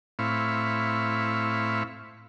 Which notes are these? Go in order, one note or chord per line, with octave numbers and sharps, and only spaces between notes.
A2 C4 E4 F5 B5 C#6